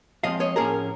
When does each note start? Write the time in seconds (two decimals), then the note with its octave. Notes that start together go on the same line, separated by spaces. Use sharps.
0.24 F3 G#3 C4 D#5 F5
0.40 C#5 D#5
0.56 A2 F3 A#3 C#4 G#4 A#4